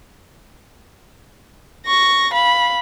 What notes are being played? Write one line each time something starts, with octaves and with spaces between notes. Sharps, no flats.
C#6 A#6
F5 B5